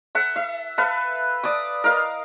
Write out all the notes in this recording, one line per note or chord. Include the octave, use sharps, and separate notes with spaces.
A4 E5 F#5
E5
A4 B4 E5 F5
D5 A5 D#6
A#4 D#5 F5